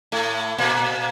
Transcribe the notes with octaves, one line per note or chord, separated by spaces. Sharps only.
A2 A3
A#2 A#3